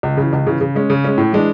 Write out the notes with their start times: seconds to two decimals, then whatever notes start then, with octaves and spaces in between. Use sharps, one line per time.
0.03 C#2
0.17 C#3
0.23 E3
0.33 C#2
0.47 C#3 E3
0.61 C#3
0.75 G#3 C#4
0.90 C#3
1.04 G#3 C#4
1.18 A2
1.32 E3 G#3 D4